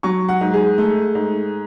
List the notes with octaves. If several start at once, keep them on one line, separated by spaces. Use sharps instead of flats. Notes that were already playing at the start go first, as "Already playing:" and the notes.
F#3 C#6
F#5
G#2
G#4
A3
G#2